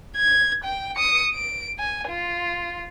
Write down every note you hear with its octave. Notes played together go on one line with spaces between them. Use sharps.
G#6
G5
D#6 C#7
D7
G#5
F4